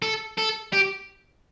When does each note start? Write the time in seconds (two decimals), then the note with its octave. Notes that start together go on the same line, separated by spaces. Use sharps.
0.02 A4
0.37 A4
0.73 G4